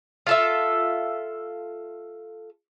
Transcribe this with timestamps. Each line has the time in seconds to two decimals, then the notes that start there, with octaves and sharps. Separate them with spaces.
0.27 F4 A4 E5